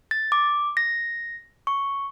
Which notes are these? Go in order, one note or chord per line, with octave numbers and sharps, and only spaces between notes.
A6
D6
A#6
C#6